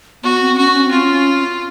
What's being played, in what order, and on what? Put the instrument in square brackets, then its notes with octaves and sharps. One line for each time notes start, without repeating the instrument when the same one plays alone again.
[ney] B3 [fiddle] F#4
[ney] C4
[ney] C#4 [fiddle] F#4
[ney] C#4
C4
[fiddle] F4
[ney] C#4